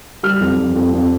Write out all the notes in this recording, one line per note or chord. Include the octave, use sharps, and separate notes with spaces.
G3 F6
F2
F2
F2
F2